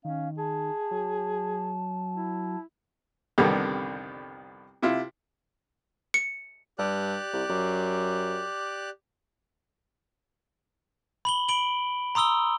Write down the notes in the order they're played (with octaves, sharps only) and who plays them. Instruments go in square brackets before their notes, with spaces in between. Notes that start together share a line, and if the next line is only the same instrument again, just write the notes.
[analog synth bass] D#3 [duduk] C#4 [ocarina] F5
[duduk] G#4 [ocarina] A5
[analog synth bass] F#3
[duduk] E4
[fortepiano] C2 F2 D3 D#3 G3 B3
C3 E4 F4
[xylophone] C#7
[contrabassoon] G2 [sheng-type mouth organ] G4 D5 F#6
[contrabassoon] C2
F#2
[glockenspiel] B5 F#7 G7
B5 D7 F#7 G7
A#5 C6 D#6 E6 G7